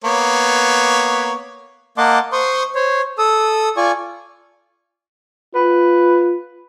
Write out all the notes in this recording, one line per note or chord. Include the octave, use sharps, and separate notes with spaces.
A#3 B3 C#5
A#3 D#5 F#5 A5 C6 D6
C5 C6 C#6 D#6
C5 C#5
A4 D#6 E6
F4 D5 G#5 C#6
F4 B4